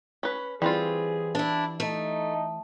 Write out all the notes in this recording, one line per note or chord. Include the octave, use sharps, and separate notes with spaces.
C#4 B4
E3 G3 C4 F4 G#4
D4 E4
A3 D#4